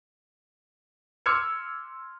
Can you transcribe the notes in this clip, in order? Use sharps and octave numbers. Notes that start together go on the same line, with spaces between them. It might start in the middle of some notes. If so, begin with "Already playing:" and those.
C6 D6 E6 F6 G#6 C#7